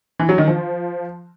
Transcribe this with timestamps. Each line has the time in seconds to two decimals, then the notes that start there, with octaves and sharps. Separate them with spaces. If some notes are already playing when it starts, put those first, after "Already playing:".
0.19 E3
0.29 F#3
0.38 D#3
0.47 F3